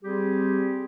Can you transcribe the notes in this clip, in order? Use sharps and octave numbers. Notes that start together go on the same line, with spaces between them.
G3 C4 G4 G#4